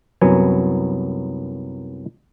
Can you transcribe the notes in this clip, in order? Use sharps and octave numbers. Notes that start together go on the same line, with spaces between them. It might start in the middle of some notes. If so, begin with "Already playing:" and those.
C2 F#2 F#3 B3 G#5